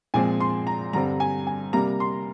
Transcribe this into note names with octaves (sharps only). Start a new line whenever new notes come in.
A#2 F3 G#3 C4 G#5
C6
A#5
G2 D3 G3 C4 A#5
G#5
G#5
C3 G3 A#3 A#5
C6